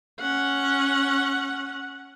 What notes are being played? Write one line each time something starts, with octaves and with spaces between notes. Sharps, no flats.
C#4 F#5